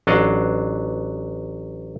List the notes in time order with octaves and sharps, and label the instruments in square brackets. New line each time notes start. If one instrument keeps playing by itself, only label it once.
[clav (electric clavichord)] A1 F#3 D4 D#5 F5 F#5